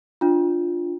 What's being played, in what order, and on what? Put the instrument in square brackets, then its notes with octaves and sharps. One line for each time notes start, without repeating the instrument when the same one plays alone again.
[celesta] D4 F4